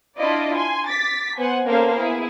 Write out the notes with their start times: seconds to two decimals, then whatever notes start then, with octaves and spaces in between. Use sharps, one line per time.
0.17 D4 E4 F4 D5 D#5
0.56 G#5 C6
0.87 D6 A6 B6
1.38 B3 C5 F#5 G#5
1.67 A#3 B3 C#4 A4 C5 F5
1.96 B3 E4 G#4